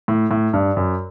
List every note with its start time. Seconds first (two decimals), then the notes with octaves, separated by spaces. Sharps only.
0.08 A2
0.31 A2
0.53 G2
0.77 F#2